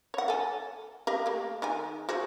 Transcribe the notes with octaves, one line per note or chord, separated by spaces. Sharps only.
C#5 F#5
A4 G#5
G4 D#5 F5
A3 A#3
D#3 G#3 G#5
F#4 G#4 C5